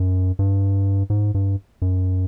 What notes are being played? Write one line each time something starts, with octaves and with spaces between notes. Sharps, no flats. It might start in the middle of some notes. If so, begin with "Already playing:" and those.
Already playing: F#2
G2
G#2
G2
F#2